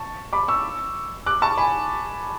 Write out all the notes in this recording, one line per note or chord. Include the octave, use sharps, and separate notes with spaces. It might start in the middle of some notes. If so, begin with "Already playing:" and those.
Already playing: A5 C#6
B5 D6
C#6 E6
D6 F#6
A5 C#6
G#5 B5